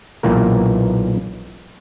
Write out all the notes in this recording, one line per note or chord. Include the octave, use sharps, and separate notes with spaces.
B1 A#2 E3 A#3 A#4